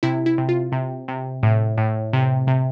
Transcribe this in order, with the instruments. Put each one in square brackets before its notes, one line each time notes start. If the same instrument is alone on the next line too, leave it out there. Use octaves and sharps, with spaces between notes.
[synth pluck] C3 E4
E4
C3
F4
C3
C3
A2
A2
C3
C3